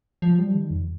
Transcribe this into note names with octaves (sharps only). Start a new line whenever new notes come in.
F3
G3
D#3
F2